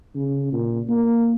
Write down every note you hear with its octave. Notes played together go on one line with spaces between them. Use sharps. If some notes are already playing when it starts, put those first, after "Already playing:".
C#3
A#2
A#3